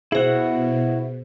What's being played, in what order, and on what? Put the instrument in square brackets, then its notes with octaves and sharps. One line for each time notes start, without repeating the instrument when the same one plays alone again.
[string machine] B2 [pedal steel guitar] E4 F#4 F#5 [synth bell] G#4 C5